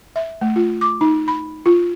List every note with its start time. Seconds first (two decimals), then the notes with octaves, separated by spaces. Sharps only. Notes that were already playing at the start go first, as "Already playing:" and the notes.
0.16 E5
0.41 A3
0.56 F4
0.81 D6
1.01 D#4
1.28 B5
1.66 F4